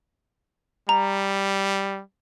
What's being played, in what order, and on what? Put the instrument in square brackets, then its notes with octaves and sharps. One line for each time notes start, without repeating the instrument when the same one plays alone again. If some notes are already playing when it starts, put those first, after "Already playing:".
[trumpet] G3 [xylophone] A#5